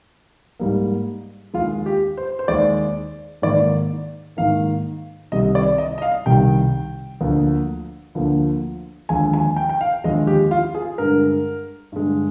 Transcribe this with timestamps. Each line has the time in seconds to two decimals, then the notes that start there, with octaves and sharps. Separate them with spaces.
0.60 G#2 G3 A#3
1.54 D#2 D#3 G#3 F4
1.86 G4
2.17 C5
2.39 C5
2.48 D#2 D#3 G#3 D5
3.42 G#2 D#3 A#3 D5
4.37 G#2 D#3 A#3 F5
5.32 C2 C3 D#3 G3 D#5
5.55 D5
5.78 D#5
5.98 D#5
6.02 F5
6.26 C2 C3 D#3 G3 G5
7.21 D2 D3 F3 A#3
8.15 D2 D3 F3 A#3
9.09 D#2 D3 F3 G#3 G#5
9.34 G#5
9.56 G5
9.69 G5
9.81 F5
10.04 D#2 D3 F3 G#3 D#5
10.27 G4
10.51 F4
10.75 G#4
10.98 G2 D3 G#3 A#4
11.92 G2 D3 G#3